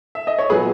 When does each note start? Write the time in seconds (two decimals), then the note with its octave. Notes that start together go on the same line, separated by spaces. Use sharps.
0.15 E5
0.27 D#5
0.38 C#5
0.50 A#2 F#3 B3 G#4 B4